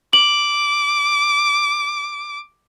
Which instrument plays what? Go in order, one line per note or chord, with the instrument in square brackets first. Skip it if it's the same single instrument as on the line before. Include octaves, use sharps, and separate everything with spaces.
[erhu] D6 [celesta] F#7